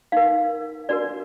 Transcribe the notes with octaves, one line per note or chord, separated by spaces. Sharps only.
D#4 A#4 F5
D4 F#4 A#4 D5